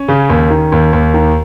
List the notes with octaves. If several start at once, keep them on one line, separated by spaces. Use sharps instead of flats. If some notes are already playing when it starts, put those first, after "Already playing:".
Already playing: C#4
C#3
D#2
D#3
D#2
D#2
D#3